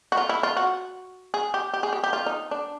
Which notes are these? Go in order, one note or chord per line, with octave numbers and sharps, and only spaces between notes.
F#4
F4
E4
F4
F#4
G#4
G4
G4
G#4
G4
G4
F4
D#4
D4